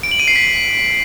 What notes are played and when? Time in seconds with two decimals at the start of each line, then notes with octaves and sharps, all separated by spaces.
0.03 D7
0.11 F#7
0.20 D#7
0.28 C7
0.36 B6